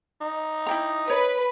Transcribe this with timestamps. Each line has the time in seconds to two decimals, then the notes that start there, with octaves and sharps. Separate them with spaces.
0.21 D#4
0.66 E4 G5 A#5
1.10 B4 C#5